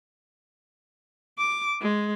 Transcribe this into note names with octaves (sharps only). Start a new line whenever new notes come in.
D6
G#3